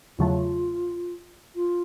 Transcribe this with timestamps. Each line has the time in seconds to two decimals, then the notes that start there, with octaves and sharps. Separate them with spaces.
0.18 E2 C#3 F#3 A3 F4
1.56 F4